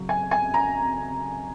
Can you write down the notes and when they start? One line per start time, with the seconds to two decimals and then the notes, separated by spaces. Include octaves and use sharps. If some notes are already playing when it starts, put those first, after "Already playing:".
Already playing: C#3 F#3
0.09 G#5
0.31 G#5
0.54 A#5